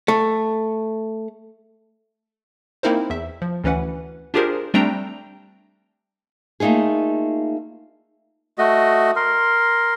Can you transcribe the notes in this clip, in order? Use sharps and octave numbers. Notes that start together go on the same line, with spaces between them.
A3
A#3 C4 D#4 E4 A#4 C5
E2 E5
F3
D2 E3 C#4 B4 F#5
D4 F4 G4 G#4 A#4 C5
G3 A3 C4 D4 G5 A#5
A3 A#3 D#4 F4 G#4
A3 F#4 D#5
A#4 C6